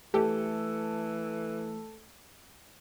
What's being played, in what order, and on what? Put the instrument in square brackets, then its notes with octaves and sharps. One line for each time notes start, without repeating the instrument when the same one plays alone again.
[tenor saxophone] E3 [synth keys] A3 [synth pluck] G4 [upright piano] A4